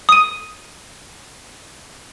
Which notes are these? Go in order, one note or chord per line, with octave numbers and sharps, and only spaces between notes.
D#6 D#7